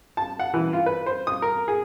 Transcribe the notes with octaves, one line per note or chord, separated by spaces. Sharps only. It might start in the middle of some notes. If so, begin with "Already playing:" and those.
A5
F#5
E3
F4
B4
C5
D#6
A#4
G#4